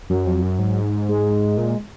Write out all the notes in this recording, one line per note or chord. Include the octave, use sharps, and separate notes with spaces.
F#2 F#3
F2
F#2
G#2
G#3
A#2